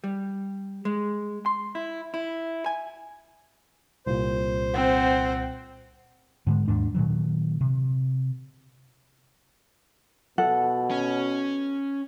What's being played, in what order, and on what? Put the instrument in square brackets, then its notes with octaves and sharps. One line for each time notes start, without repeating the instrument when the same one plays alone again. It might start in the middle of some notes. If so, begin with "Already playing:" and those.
[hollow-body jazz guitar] G3
G#3
C6
E4
E4
G#5
[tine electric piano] C2 A#2 [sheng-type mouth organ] C5
[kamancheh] C4 F#5
[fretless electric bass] G#2 D3 G#3
D#2 G#2 D4
A#2 D#3 F#3
C3
[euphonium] B2 [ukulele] A4 F#5
[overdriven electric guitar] C#4